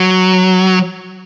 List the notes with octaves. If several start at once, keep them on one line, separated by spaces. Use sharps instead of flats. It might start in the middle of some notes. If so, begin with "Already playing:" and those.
Already playing: F#3